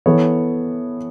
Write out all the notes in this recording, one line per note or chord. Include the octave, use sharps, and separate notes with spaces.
E3 B3 A4 C#5